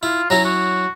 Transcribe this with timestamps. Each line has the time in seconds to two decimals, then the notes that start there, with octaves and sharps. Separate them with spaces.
0.03 E4 F4
0.30 F#3 C#4 E4 A#5
0.45 F#4